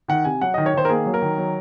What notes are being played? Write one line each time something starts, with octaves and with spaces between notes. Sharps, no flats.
D#3 F#5
C3 G#5
F#3 F#5
D#3 D#5
C#5
D#3 C5
A#4
A#3 G#4
F#3
A#4
D#3
F#3